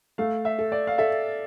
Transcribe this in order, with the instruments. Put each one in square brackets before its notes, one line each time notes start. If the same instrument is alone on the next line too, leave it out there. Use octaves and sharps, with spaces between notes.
[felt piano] A3 [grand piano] F5
[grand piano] E5
[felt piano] A4
[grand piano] D5
F5
[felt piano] A4 [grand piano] E5